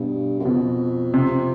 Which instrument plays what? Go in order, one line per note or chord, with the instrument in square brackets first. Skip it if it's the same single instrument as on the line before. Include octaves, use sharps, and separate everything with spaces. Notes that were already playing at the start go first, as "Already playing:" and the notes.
Already playing: [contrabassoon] G2 [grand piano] B2
[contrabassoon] F#2
[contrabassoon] F2 [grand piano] B2
[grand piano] C3